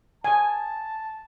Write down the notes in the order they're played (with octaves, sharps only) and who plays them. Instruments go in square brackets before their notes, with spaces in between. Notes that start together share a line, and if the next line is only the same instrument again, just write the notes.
[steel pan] G#5 [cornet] A5